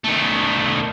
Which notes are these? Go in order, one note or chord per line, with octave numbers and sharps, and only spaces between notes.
D#3 A3